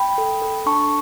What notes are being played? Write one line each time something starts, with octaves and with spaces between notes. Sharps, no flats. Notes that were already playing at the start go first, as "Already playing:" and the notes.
Already playing: G5 B5
A4
A4
D4 A5 C#6